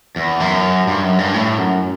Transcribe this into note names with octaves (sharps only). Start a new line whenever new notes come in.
E2
F#2
G2
F#2
G2
A2
F#2